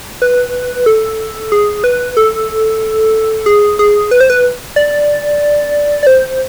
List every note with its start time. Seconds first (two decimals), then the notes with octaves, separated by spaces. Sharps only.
0.22 B4
0.86 A4
1.52 G#4
1.84 B4
2.17 A4
3.46 G#4
3.79 G#4
4.11 B4
4.21 C5
4.30 B4
4.76 D5
6.03 D5
6.07 C5